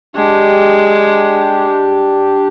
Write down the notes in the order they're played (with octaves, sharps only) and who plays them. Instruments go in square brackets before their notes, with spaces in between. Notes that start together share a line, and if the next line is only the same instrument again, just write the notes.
[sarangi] G#3 [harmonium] D4 G4